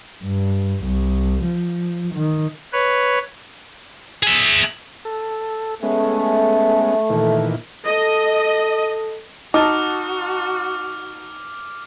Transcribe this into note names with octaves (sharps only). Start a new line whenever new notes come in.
G2
C2
F3
D#3
B4 C#5
G#4 E5
A4
G#3 A3 B3 C#4
A#2 D#3 E3
A4 D#5
D#4 F#4 D#5 A5 D6 F6